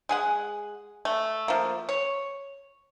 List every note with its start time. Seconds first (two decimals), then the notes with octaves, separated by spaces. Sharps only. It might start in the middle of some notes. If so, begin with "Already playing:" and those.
0.09 G#3 G#4 F#5
1.05 A3
1.48 F3 A#3
1.89 C#5